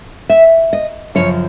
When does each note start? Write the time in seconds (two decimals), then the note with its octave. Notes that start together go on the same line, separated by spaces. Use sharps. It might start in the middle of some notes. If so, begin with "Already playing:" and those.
0.30 E5
0.73 D#5
1.15 F#2 C#3 F3 C#5